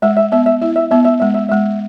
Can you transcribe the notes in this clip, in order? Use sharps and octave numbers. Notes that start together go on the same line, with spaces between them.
G#3 E5
E5
B3 E5
E5
E4 E5
E5
B3 E5
E5
G#3 E5
E5
G#3 E5